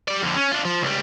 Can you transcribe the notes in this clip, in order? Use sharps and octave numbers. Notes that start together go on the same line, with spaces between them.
G3 D5
F2 D3
C#4
D4 F4
F3
C#2 G3